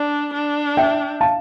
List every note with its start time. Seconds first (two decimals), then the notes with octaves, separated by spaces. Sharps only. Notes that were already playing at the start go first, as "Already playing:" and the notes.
Already playing: D4 D5
0.34 D4
0.77 E5 G5
1.21 F5 A5